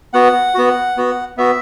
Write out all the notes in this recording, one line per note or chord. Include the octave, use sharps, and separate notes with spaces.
B3 F#4 F#5
B3 F#4
B3 F#4
B3 F#4 E5